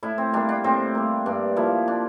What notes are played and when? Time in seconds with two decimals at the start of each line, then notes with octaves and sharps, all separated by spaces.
0.03 A2 E4
0.18 C4
0.33 G3 A#3 D4
0.49 D4
0.64 A2 C4
0.95 G3 A#3
1.26 G2 D4
1.56 F3 A#3 E4
1.88 D4